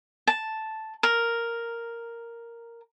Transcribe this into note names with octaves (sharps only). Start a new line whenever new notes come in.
A5
A#4